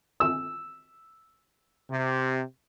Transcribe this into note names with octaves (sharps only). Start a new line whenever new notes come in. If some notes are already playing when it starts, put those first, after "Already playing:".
E6
C3